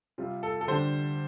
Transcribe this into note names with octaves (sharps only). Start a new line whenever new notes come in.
C3 G3 F4
A4
A4
D3 G3 D4 C5